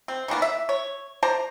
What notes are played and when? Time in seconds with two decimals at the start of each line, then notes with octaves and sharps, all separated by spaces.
0.08 C4
0.28 D#3 E3 A#3 B3
0.42 E5
0.69 C#5
1.23 C5 D5 A5 A#5